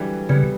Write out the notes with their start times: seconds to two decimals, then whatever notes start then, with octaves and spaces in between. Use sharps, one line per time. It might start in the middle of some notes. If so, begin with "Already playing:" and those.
Already playing: D3 E3 F#3 G3
0.29 C#3 G3 B3